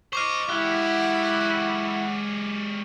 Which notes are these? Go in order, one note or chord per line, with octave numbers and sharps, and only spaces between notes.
C5 D#5 C#6 D6 F6
G#3 E4 G4 F#5